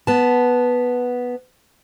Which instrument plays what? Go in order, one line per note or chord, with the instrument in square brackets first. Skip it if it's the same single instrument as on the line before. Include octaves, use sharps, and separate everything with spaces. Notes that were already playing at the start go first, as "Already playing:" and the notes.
[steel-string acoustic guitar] B3 A5